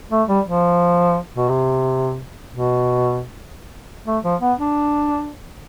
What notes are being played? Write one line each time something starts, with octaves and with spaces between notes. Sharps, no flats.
A3
G3
F3
B2
C3
B2
A3
F3
B3
D4